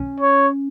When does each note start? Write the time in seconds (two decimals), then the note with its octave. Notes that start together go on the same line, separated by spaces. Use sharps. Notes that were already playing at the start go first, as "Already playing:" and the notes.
Already playing: C#4
0.20 C#5